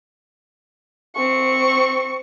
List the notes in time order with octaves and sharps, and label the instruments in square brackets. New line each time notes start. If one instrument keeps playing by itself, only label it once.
[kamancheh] C4 C#6